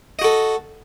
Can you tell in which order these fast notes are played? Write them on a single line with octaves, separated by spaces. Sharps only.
D#5 F#4 A4